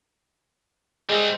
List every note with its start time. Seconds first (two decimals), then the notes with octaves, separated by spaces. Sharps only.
1.09 G3 G#3 C4